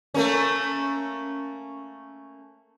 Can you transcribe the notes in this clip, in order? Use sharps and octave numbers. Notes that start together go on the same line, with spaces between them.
A3 A#3 C#4